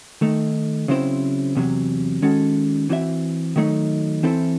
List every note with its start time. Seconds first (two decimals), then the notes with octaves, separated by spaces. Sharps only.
0.21 D#3 A3 D#4
0.88 C#3 F#3 C4 E4 C5
1.55 E2 C3 D#3 F#3
2.22 D#3 G#3 C#4 F#4 A4
2.89 E3 C4 F#4 C5 E5
3.56 D#3 F#3 A3 D#4
4.23 E3 C4 E4 A4 C5